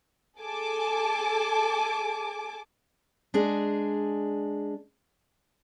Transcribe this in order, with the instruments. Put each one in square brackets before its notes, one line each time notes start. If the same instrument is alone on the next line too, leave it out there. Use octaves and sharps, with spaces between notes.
[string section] G#4 A4 G#5 A5 D6
[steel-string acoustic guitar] G#3 D4 G#4